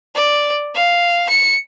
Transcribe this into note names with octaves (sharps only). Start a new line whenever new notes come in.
D5
F5
C#7